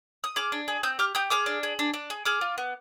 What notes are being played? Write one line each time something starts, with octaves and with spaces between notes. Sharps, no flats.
D#6
G#4 D6 F6
D4
G#4
C4 D#6 G6
G4 D6 F6
G4 D#6 G6
G#4 D6 F6
D4
G#4
D4
D4
G#4
G#4 D6 F6
F4
B3